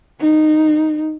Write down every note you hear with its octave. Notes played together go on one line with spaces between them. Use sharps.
D#4